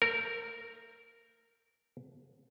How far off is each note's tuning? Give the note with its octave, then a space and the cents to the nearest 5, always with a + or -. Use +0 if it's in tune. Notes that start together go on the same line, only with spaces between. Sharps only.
A3 +35 A#4 -10